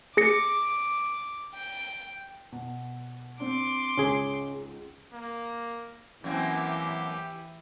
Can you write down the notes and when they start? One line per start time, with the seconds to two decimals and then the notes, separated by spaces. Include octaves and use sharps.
0.17 G#4 D6 A#6 C#7
1.54 G5
2.52 B2
3.40 C4 D4 C6 D6
3.98 C#2 G#2 C#4 G#4
5.14 A#3
6.24 F#2 E3 A#3 C4 G4